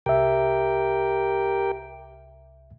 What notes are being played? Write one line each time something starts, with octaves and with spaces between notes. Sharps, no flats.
C2 G4 A#4 E5 G5